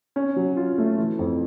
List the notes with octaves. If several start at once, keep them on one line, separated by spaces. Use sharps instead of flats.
C#4
F#3
F4
A3
E3
F2